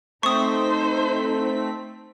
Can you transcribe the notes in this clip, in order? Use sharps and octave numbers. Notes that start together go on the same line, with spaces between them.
A3 C4 D#4 C5 C#6 D#6 B6